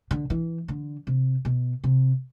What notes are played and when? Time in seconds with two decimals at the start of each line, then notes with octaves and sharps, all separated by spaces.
0.11 D3
0.30 E3
0.68 D3
1.07 C3
1.45 B2
1.84 C3